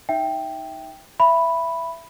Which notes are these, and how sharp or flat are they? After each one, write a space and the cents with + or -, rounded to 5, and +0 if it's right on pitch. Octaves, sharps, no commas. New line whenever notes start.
D#4 +5 E5 +0 G5 +0
E5 +15 B5 +0